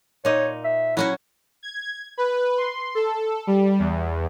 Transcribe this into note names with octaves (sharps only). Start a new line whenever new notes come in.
A#2 D#4 C#5
E5
F#3 C#4 E4 F#4
G#6
B4
C6
A4
G3
E2